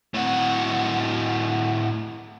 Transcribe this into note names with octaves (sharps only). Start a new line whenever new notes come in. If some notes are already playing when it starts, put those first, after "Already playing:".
A2 F#4